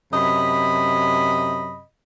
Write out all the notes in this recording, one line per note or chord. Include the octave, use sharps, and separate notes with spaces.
F#2 C3 D#5 B5